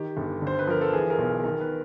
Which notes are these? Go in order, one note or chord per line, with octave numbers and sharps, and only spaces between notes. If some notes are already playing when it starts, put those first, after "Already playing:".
Already playing: D#3 G4
G1
D3 C5
B4
F3 A#4
A4
E3 G#4
A#4
B1
D#3 A#4
B4